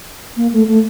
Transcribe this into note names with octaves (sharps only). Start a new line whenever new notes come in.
A#3
A3
A3